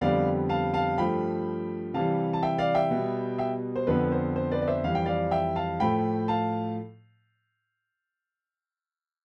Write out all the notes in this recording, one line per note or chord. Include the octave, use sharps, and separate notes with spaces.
F2 D3 G3 B3 D5 F5
F5 A5
F5 A5
G2 F3 A3 G5 B5
C3 E3 G3 F5 A5
A5
E5 G5
D5 F5
E5 G5
B2 G3 B3
E5 G5
C5
F2 D3 F3 B3 B4
C5
C5
B4 D5
D5
C5 E5
F2 E3 G3 F5
G5
D5 F5
E5 G5
F5 A5
A2 F3 A3 G5 B5
F5 A5